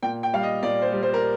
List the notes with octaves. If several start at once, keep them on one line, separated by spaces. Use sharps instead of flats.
A#2 G5
G5
G3 F5
D#5
A#2 D5
C5
G3
C5
A#4